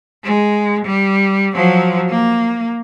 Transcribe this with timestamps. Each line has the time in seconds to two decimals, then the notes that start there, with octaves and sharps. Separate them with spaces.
0.24 G#3
0.85 G3
1.55 F3 F#3
2.09 A#3